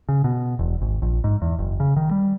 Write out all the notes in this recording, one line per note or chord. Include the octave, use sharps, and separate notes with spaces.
C#3
B2
E1
G#1
A#1
G#2
E2
F#1
C#3
D#3
G3